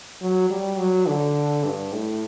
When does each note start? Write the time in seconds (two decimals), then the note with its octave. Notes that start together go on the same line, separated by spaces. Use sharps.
0.21 F#3
0.50 G3
0.78 F#3
1.07 D3
1.64 G2
1.93 A2